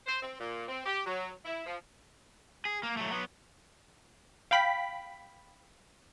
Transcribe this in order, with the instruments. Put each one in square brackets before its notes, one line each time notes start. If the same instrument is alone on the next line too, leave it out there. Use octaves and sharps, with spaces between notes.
[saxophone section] C5
C4
A#2
C4
G4
F#3
E4
F3
[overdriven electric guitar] G#4
A#3
F#3 A3
F#3 B3
[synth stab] F5 G5 B5 B6